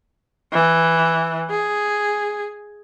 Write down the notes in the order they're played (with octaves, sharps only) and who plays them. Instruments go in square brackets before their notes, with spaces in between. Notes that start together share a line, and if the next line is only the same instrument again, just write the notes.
[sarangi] E3
G#4